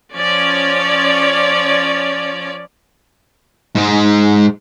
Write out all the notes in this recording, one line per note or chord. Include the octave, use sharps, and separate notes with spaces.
F3 C#4 C#5 D5
G#2 G#3